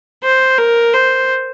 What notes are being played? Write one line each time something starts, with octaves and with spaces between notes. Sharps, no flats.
C5
A#4
C5